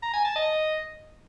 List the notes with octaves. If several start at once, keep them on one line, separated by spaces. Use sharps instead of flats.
A#5
G#5
A5
D#5